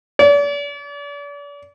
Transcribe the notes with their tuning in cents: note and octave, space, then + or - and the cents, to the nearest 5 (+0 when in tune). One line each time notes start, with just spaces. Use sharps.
D5 -40